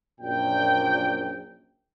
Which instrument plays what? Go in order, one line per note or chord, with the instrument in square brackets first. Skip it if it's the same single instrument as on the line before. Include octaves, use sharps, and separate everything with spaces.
[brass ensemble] A#1 F#2 A#2 G5